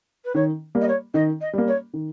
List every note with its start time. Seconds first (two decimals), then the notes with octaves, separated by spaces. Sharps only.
0.24 B4
0.35 D#3 C#5
0.75 G3 A#3
0.81 D#5
0.88 C#5
1.14 D#3 D#5
1.41 D#5
1.53 G3 A#3
1.67 C#5
1.94 D#3